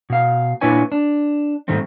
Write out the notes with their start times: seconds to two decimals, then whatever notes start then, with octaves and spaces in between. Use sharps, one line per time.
0.10 B2 F5
0.61 A#2 D4 E4 B4 C#5 G#5
0.92 D4
1.68 G#2 D#3 G3 A3 C4